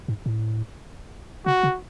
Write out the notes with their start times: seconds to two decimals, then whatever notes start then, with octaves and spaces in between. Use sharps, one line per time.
0.08 G#2
0.26 A2
1.46 C#3 F#4
1.63 C#3